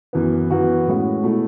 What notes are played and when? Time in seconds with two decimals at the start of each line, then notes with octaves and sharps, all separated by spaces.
0.13 F#2 E3 B3
0.50 F#2 E3 B3 F#4
0.87 A2 G#3 C#4 F#4
1.23 B2 A3 E4